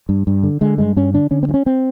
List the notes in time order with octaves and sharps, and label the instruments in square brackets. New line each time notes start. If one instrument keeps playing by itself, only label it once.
[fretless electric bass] G2
G2
D3
D3 G#3
G2 G#3
G2 C#4
D3 D4
D3 C#4
C4
G2
C#4
C4